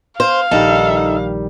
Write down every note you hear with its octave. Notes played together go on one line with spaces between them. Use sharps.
C5 F5
A#1 D#3 G3 D#4 A4